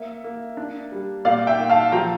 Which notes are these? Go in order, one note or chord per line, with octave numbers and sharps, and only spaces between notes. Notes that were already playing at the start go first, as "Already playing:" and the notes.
Already playing: A#3 E5
A#3
D4
G3
A#2 D5 F5
E5 G5
A#2
F5 A5
F3 G5 A#5